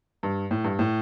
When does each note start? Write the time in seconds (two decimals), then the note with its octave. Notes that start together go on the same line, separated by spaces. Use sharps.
0.23 G2
0.51 A2
0.64 G2
0.79 A2